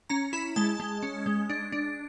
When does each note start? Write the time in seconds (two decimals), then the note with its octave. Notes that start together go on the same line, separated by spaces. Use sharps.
0.10 C#4 A#5
0.33 E4 B5
0.56 G#3 A5
0.80 G#3
1.03 C#4
1.26 G#3
1.49 D4
1.72 D4